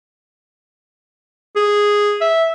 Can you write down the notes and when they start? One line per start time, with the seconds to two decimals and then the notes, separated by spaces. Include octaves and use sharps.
1.56 G#4
2.21 E5